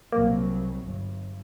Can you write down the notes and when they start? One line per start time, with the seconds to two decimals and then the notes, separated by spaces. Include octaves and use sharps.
0.12 C2 F#3 A#3
0.85 G1